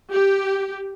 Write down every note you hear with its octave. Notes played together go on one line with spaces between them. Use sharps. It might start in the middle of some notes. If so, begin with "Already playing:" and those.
G4